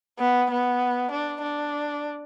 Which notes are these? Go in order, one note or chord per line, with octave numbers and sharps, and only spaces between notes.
B3
B3
D4
D4